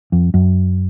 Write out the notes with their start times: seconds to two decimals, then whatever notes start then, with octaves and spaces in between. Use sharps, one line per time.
0.12 F2
0.34 F#2